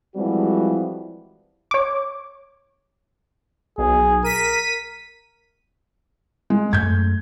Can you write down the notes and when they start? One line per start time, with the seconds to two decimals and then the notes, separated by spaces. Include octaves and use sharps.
0.16 E3 F3 G3 G#3 C4 F#4
1.71 C#5 D6
3.78 B1 G#4
4.24 A#4 B6 D#7
6.50 G#3
6.73 F#2 A3 G6 G#6